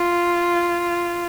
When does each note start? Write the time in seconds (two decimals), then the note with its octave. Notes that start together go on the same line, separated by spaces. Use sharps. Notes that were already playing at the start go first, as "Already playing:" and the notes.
Already playing: F4